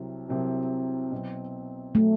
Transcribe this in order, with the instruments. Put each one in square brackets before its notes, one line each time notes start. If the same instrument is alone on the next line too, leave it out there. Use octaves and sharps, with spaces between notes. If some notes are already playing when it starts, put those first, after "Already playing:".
Already playing: [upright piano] C2 C3 F#3 C4
C2 C3 F#3 C4
B2 F#3 C4
[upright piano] B2 F#3 C4 [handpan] A3